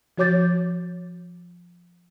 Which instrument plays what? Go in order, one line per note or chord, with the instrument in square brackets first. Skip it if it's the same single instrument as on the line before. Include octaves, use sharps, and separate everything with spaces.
[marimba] F3 F#4 C#5 D6 G6 A6